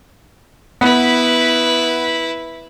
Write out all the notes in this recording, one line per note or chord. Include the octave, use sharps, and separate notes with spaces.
B3 E4 B4